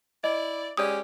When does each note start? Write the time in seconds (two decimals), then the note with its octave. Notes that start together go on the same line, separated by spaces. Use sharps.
0.24 E4 D5 D#5
0.77 G#3 C#4 G4 D5 D#6